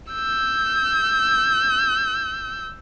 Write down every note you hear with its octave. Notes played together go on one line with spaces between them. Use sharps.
E6 G6